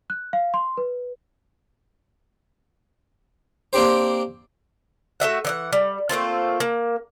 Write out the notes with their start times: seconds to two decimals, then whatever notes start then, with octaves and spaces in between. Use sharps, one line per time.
0.10 F#6
0.33 F5
0.54 C6
0.77 B4
3.73 A#3 C4 D4 G4 C5
5.20 A3 F#4 E5 F#5
5.45 E3 D#5 F#5
5.73 G3
6.09 A3 A#3 C4 F4
6.60 A#3